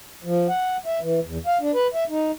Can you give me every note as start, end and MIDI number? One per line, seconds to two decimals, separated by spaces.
0.24 0.47 53
0.49 0.77 78
0.86 0.99 76
1.01 1.20 52
1.24 1.38 40
1.47 1.58 77
1.61 1.72 62
1.74 1.87 71
1.94 2.04 76
2.09 2.31 63